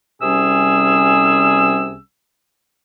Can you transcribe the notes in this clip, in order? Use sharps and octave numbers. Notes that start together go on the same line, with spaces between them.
C2 C3 G3 C#4 G#4 E6